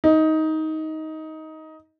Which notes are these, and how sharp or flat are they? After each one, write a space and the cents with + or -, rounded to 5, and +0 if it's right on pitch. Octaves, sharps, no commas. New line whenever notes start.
D#4 +15